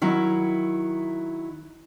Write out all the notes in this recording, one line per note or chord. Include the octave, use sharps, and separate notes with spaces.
D#3 F#3 E4